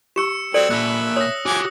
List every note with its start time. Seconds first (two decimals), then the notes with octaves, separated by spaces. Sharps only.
0.16 G4 C#6 E6 C#7 E7
0.54 F#3 C4 A4 D5 C#7 F#7
0.70 A#2 E5 B5 F#6
1.16 C#5 D#6 A#6
1.46 F3 F#4 G4 G#5 D6